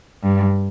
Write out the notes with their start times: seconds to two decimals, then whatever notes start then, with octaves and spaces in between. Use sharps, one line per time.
0.23 G2